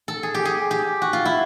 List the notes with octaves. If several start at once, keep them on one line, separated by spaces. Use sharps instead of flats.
A4
G#4
G4
G#4
G4
F#4
F4
E4